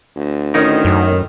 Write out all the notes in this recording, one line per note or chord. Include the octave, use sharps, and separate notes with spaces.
D2
A2 D#3 C#4 D#4 A#4
F#2